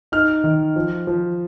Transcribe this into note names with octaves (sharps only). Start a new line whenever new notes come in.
D#4 F6
D#3
F3
F3